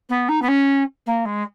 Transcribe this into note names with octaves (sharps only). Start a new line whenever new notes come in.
B3
D#4
B3
C#4
A#3
G#3